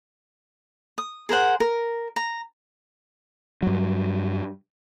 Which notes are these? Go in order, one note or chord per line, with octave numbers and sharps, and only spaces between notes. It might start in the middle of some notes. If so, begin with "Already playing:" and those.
D#6
G#4 A#4 C5 F#5
A#4
A#5
G2 F#3